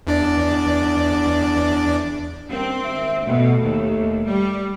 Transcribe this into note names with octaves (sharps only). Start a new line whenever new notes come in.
E2 D4 D5
G2 D#3 A#3 C4
D#2 G#2 E5
B2 A3
D#2
G3